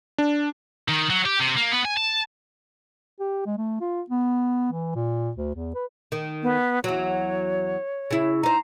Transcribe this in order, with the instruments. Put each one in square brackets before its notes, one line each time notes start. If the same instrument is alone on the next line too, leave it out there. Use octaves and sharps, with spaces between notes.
[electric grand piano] D4
[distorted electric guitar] D#3
F#3
G4
C3
A#3
B3
G#5
A5
[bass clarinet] G4
G#3
A3
F4
B3
E3
A#2
D2
E2
B4
[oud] D#3
[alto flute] B3
[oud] E2 F#3 [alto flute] C#5
[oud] C#3 E4
[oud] D#4 C5 [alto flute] A#5